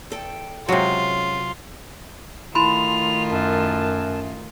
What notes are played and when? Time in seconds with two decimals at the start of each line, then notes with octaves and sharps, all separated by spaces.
0.10 E2 A4 G5
0.69 C3 F#3 G#3 C#4 F4 F#4
2.55 D#3 A3 E4 F4 B5 C6 F7
3.31 F#2 A5